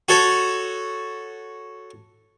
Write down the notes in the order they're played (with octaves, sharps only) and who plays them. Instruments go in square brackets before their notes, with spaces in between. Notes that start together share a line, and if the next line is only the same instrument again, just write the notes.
[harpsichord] F#4 A4 C#5